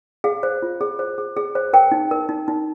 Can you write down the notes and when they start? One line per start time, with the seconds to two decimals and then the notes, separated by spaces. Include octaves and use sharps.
0.24 G#4 F5
0.43 C5
0.62 F4
0.81 G#4
0.99 C5
1.18 G#4
1.37 G#4
1.55 C5
1.73 A#4 G5
1.92 D#4
2.11 A#4
2.29 D#4
2.48 D#4